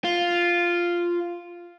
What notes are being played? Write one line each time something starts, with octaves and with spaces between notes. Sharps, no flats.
F4